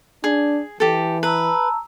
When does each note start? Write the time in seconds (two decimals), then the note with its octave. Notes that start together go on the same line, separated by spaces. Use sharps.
0.24 D4 G#4
0.80 E3 G4 A4
1.23 B4 A5 A#5 E6